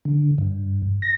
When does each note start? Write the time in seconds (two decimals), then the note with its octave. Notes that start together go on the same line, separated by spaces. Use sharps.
0.05 D3
0.38 G2
1.02 A#6